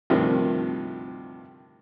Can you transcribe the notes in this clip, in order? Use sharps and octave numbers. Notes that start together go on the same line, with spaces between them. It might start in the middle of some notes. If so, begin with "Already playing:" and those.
D2 G2 C3 D#3 F3